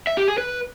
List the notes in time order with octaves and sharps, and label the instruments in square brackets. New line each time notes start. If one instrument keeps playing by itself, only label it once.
[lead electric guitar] E5
G4
G#4
B4